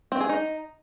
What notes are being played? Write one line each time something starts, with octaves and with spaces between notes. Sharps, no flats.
C4
G#4
D#4